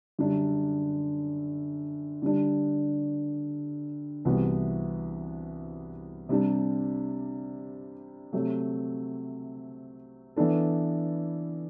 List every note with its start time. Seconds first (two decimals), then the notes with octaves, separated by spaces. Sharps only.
0.19 F#2 D3 G3 D4
2.22 D3 G3 D4
4.25 C2 C3 E3 B3 F#4
6.29 C3 G3 D4 G4
8.33 C3 F#3 A3
10.36 E3 B3 D4 A4